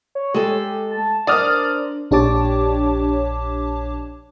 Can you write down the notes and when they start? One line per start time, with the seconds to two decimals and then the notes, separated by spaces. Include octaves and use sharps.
0.15 C#5
0.34 G#3 G4 A4
0.91 A5
1.27 D4 A#4 C5 D5 D#6 F6
2.11 A#1 D4 G4 C#5 A5 D6